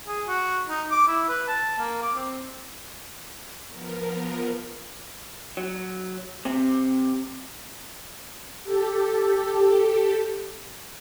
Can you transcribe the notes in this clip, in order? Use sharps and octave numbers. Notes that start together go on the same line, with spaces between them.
G#4
F#4
D#4
D6
E4
B4
A5
A#3
D6
C4
F3 B3 A#4
F#3
C3 C4
G4 A4